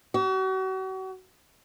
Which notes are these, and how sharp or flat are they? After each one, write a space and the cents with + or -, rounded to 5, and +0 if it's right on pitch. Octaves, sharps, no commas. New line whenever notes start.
F#4 +40